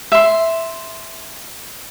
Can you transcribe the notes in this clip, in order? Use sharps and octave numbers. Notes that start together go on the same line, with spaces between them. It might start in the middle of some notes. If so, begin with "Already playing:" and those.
E5 C6